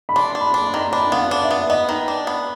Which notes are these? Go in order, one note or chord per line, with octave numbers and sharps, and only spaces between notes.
B5
D4 C6
D4
B5
D4
C6
D#3
D4 B5
B3 F5
F#5
D4
E5
B3
B3 D#5
D#3
D4
B3